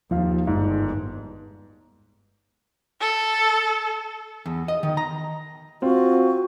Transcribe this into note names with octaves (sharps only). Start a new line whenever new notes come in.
D#2 F3 F5
G1 G#2
A4
E2
D#5
D#3
A#5
C4 F4 F#4